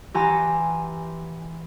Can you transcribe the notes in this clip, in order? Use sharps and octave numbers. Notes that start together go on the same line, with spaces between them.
E3 G4 F#5 G#5 A#5 C6